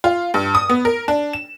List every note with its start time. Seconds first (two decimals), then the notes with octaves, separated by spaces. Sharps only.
0.04 F4
0.34 G2
0.55 D#6
0.69 B3
0.85 A#4
1.08 D4
1.33 E7